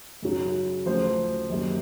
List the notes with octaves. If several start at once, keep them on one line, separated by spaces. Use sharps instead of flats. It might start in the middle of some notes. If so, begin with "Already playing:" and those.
F#2 C#3 F#3
D2 C#3 F3 C5
F#2 D#3 G3 A#3